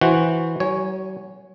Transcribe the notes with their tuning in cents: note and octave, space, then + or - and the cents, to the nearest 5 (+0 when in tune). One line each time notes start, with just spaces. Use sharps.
E3 +0 F#4 +0 C5 +0
F#3 +45 C#5 +0 G#5 +0